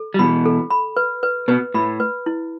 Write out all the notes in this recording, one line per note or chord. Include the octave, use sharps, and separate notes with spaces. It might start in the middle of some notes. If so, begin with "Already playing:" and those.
Already playing: A4
G3
B2 E3 B5
A4
B5
B4
B4
B2 B4
A2 B5
B4
E4